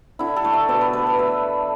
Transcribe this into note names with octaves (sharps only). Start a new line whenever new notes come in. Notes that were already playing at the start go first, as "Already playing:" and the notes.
D3 E4
A4
A3
E5
B2 D5
B4
A3 B4
B4
A3 E5